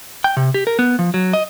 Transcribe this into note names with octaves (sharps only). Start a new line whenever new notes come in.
G5
C3
G4
A#4
B3
F3
F#3
D#5